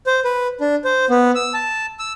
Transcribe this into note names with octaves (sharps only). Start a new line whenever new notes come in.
C5
B4
D4
C5
B3
E6
A5
E6